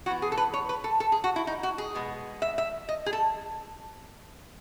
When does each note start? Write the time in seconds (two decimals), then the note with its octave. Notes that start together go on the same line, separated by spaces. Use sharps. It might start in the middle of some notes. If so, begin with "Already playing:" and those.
0.06 E3 B3 F#4
0.22 G#4
0.32 A4
0.37 B4
0.54 C#5
0.69 B4
0.84 A4
1.00 A4
1.12 G#4
1.24 F#4
1.36 E4
1.47 D#4
1.63 F#4
1.78 G#4
1.95 B2 G#3 B3
2.42 E5
2.58 E5
2.89 D#5
3.06 G#4
3.13 A4